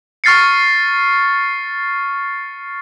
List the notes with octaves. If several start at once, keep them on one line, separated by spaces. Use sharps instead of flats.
C#6 F6 A6 C7 C#7